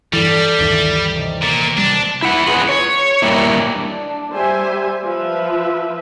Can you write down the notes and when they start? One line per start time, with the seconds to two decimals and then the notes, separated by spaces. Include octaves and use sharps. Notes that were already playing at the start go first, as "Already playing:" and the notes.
0.13 G2 E3 G3 A4 D5
0.58 D1 G2 D#3 E3 A6
1.16 C3 D#5
1.42 D#1 A#2
1.78 G3 C4 D4
2.23 E4 F#5
2.47 F4 G#4 A#4 B4
2.69 C#5
3.22 G3 A#3 E4
3.77 D4
4.34 G3 C5 E5 G#5
5.04 F3 F4 B4 E5